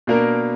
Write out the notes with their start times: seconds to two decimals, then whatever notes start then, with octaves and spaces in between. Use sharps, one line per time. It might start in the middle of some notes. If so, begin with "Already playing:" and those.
0.07 B2 A#3 D4 A#4